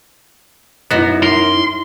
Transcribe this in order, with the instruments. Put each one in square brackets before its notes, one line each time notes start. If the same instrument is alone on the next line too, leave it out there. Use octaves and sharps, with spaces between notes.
[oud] F#2 D#4 [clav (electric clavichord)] B3 F#4 [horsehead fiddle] E4
[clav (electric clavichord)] A#4 [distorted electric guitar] C6